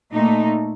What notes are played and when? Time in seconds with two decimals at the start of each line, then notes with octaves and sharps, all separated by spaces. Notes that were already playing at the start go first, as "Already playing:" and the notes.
0.12 A#2 A3 D#4